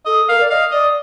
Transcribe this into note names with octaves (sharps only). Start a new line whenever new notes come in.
A4 D#5
A#4 F5
D5
D#5 F5
D5 D#5